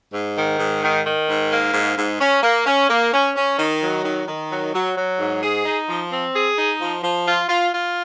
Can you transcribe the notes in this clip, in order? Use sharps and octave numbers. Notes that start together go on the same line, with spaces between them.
G#2
D#3
G#2
D#3
D#3
G#2
A#3
G#2
G#2
C#4
A#3
C#4
A#3
C#4
C#4
D#3
F#3
D#3
D#3
F#3
F#3
F#3
G#2
G#4
D#4
F3
C4
G#4
D#4
F3
F3
F4
F4
F4